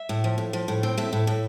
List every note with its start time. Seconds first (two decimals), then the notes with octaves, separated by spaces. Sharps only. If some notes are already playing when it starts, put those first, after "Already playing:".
Already playing: E5
0.09 A2
0.24 F3
0.38 A2
0.53 F3
0.68 A2
0.83 C4
0.97 A2 E5
1.13 A2
1.27 A2